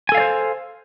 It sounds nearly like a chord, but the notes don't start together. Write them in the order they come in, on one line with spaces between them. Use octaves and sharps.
G#5 A4 F5 D5 C5